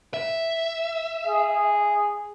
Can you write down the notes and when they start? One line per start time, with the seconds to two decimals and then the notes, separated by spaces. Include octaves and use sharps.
0.14 E5
1.27 G#4